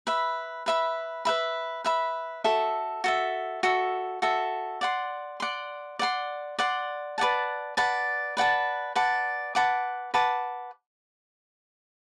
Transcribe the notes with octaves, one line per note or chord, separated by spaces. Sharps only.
B4 E5 B5
B4 E5 B5
B4 E5 B5
B4 E5 B5
F#4 A4 E5
F#4 A4 E5
F#4 A4 E5
F#4 A4 E5
D5 F#5 C6
D5 F#5 C6
D5 F#5 C6
D5 F#5 C6
B4 D5 F#5 A5
B4 D5 F#5 A5
B4 D5 F#5 A5
B4 D5 F#5 A5
B4 F#5 A5 D6
B4 F#5 A5 D6